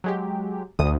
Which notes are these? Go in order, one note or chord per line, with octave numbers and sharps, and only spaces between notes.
F#3 G#3 G4
D2 D#6